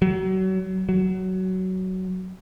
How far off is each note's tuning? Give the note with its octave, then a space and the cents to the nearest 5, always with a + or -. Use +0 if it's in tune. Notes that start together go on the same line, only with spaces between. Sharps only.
F#3 +30
F#3 +15